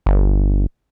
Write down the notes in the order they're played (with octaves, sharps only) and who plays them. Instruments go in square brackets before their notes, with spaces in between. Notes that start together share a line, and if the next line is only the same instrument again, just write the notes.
[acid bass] G1